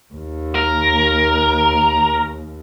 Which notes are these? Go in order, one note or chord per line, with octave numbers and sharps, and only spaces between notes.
D#2
A#4